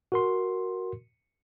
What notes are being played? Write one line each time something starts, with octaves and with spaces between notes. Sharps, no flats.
F#4 A#4 C6